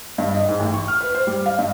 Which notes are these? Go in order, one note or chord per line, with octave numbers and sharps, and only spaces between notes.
G2
D#5
G#2
A1
C#6
F6
B4
C5
G3
F5
G2